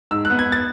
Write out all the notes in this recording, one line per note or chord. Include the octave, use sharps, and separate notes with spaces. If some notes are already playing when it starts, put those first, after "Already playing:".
G#2 E6
F#6
B3
G#6
A6